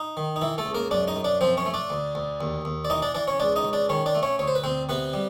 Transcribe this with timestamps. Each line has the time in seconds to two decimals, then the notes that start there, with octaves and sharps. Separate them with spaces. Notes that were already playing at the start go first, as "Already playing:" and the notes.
Already playing: D#4
0.17 D#3
0.36 D#4
0.42 E3 E4
0.58 A3 A4
0.66 C#2
0.75 A#3 A#4
0.91 F#2 D4 D5
1.08 D#4 D#5
1.16 F#2
1.24 D4 D5
1.41 F3 C4 C5
1.57 C#4 C#5
1.66 A3
1.74 D4 D5
1.90 D2
2.15 D2
2.41 D#2
2.65 D#2
2.85 D5
2.90 E3 D#4 D#5
3.02 D4 D5
3.14 E3 D4 D5
3.28 C#4 C#5
3.39 C#2 D4 D5
3.56 D#4 D#5
3.65 C#2
3.73 D4 D5
3.89 D#3 C#4 C#5
4.06 D4 D5
4.15 A3
4.23 C#4 C#5
4.39 D2 C#5
4.48 C5
4.55 B4
4.64 D2 C4 C5
4.89 C3 B3 B4
5.14 G3